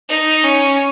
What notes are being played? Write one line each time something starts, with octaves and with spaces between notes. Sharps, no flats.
D#4
C#4